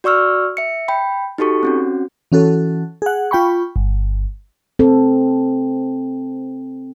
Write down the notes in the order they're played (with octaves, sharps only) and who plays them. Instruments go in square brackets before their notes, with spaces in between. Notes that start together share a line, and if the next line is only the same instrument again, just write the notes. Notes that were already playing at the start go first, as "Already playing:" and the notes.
[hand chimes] F#4 D5 C#6 E6 F6
E5 C#7
G5 B5
D#4 F#4 G4 A4 C#6
C4 C#4 F#4
[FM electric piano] E3 C#4 F#4 A4
G#4 F#5
F4 G5 B5 C#6
G1
[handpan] C4 A4